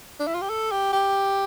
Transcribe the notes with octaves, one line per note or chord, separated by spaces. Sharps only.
D4
E4
F4
G4
A4
G4
G4